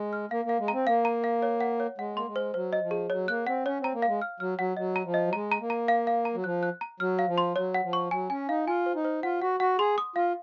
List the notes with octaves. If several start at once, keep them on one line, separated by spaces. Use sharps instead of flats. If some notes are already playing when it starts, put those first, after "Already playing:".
Already playing: G#3
F6
A#3 F5
A#3 F5
G#3
C4 A#5
A#3 F5
A#5
F5
C#5
F#5
C#5
G#3 F#5
A#3 C6
G#3
C5
F#3 C5
D#5
F3
G#4
F#3 C#5
A#3 F#6
C4 F#5
C#4 C#5
C4 A#5
A#3
G#3 F5
F6
F#3 F6
F#3 F#5
F#3 D#5
A#5
F3
D#5
F#3
G#3 A#5
A#5
A#3
A#5
F5
F5
A#5
F#3
F3 F#6
F#6
A#5
F#3 F6
F5
F3
C6
F#3 C#5
F#5
F3
C#6
F#3 G#5
C#4 G#5
D#4 F5
F4 G#5
C5
D#4
C5
F4 F#5
F#4 F#5
F#4 F#5
G#4 C6
D#6
F4 F5